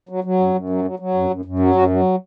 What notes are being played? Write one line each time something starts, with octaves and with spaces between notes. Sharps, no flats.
F#3
F#3
F#2
F#2
F#3
F#3
F#3
F#2
F#2
F#2
F#3
F#2 C#4 F#4
F#3